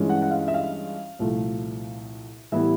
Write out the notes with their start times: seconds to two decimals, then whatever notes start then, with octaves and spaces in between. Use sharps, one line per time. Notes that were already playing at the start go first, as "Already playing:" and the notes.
Already playing: G2 E3 G#3 C#4 F4
0.09 F#5
0.22 F#5
0.31 F5
0.48 E5
0.54 F5
1.19 C2 A#2 F3 A3
2.52 A2 E3 G3 B3 E4 E5